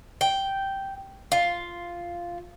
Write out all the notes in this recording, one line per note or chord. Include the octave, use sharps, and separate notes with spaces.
G5
F4